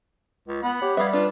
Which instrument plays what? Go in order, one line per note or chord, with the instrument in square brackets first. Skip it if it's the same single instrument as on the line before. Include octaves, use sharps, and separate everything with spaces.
[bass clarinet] C#2
[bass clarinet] B3 [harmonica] F#5 B5
[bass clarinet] G4 [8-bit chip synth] C#5
[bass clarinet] G3 [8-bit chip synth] B4 D#6 G#6 [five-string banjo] E5 F5
[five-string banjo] D4 [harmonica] F4 [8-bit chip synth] B4